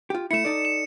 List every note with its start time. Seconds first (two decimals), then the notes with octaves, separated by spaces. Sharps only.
0.10 F4 G4
0.31 A3 E4 C#7 E7
0.45 D#4 A4 D5
0.65 E7